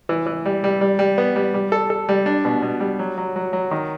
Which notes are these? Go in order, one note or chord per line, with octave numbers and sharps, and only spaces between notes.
E3
E3
G3
G3
G3
G3
B3
G3
G3
A4
A4
G3
D4
B2
B2
G3
F#3
F#3
F#3
F#3
D#3